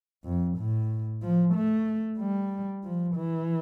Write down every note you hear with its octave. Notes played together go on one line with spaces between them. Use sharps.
F2
A2
F3
A3
G3
F3
E3